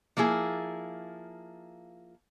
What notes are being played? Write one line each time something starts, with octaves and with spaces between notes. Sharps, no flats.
F3 A#3 E4 G#4